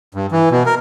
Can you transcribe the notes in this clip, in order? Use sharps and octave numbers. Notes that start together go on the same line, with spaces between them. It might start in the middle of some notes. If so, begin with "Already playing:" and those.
G2
E3
B2
A#4